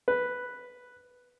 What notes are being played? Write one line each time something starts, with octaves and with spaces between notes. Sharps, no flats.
B4